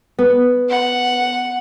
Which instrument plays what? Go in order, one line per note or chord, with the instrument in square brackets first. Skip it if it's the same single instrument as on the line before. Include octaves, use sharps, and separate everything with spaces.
[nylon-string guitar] B3
[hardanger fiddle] F#5